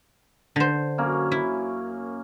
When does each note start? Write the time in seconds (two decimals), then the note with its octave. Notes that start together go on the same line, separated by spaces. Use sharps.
0.56 D3 C5
0.98 F#2 A#3 C#4
1.32 E4